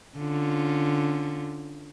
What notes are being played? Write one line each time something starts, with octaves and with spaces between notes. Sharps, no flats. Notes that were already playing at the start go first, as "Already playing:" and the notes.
D3 C#4 F4